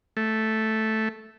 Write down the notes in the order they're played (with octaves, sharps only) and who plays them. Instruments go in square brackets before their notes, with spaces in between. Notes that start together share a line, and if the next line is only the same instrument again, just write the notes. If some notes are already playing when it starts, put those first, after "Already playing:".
[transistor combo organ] A3